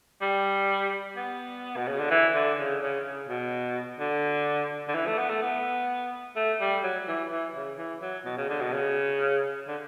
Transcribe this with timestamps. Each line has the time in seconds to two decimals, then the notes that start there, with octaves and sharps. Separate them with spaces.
0.21 G3
1.16 B3
1.76 B2
1.87 C#3
1.98 D3
2.11 E3
2.35 D3
2.58 C#3
2.82 C#3
3.05 C#3
3.28 B2
3.99 D3
4.88 D3
4.95 E3
5.06 A3
5.18 B3
5.29 A3
5.41 B3
6.36 A3
6.60 G3
6.83 F#3
7.08 E3
7.31 E3
7.55 C#3
7.78 E3
8.02 F#3
8.25 B2
8.37 C#3
8.49 D3
8.60 B2
8.72 C#3
9.68 D3